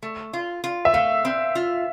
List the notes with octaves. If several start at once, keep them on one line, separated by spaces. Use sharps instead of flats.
A3
F4
F4
E5
A3 F5
C4
F4